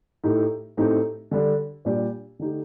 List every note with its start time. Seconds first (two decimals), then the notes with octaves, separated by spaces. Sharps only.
0.24 A2 A3 D#4 G4
0.77 A2 A3 C4 D#4 G4
1.31 D3 G3 D4
1.85 A#2 G3 D4 G4
2.39 D3 A3 D#4 G4